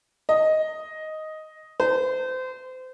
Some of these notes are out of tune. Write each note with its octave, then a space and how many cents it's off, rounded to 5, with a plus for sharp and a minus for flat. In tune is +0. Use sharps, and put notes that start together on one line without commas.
D#5 +5
C5 -30